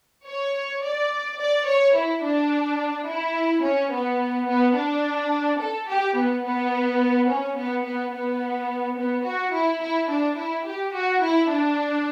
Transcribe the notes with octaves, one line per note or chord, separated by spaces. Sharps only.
C#5
D5
D5
C#5
E4
D4
E4
C#4
B3
B3
D4
A4
G4
B3
B3
C#4
B3
B3
B3
B3
F#4
E4
E4
D4
E4
G4
F#4
E4
D4